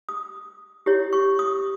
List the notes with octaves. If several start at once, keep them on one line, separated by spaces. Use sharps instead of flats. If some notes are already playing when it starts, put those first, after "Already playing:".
D#6
E4 G4 C#5
C#6
D#6